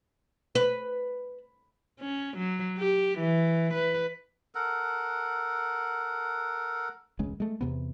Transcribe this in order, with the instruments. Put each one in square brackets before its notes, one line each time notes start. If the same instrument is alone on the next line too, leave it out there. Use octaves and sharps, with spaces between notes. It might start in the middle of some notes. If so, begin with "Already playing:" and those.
[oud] B4
[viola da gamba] C#4
F#3
G4
E3
B4
[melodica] A4 A#4 F#5
[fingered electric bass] E1 C#2 C#3 G#3
G#3 A3
E2 C3 B3